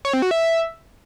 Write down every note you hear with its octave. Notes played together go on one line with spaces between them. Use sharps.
C#5
C4
F#4
E5